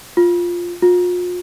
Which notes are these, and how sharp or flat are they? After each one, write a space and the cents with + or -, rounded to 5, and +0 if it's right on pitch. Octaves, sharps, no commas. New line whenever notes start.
F4 +0
F4 +40